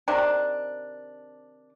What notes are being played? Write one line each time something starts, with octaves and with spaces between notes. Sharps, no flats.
C3 D#3 D4